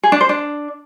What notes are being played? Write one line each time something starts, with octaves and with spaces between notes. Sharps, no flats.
G#4
D4
C5
D4